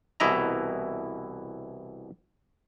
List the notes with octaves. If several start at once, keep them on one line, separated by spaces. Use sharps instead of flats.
C2 B2 E3 E4 D#5 A#5